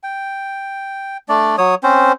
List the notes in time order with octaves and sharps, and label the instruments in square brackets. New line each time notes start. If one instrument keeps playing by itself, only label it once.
[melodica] G5
A3 D4 D5
F#3 C#5 D#6
C4 C#4 C5